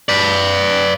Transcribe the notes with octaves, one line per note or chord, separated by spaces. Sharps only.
B4 D5